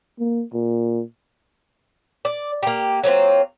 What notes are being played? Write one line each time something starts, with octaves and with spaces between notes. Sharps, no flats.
A#3
A#2
D5
A#3 G4
F#3 A#3 C4 F4